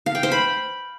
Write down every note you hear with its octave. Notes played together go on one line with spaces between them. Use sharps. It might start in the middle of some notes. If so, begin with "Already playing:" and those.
F5
G5
C5
B5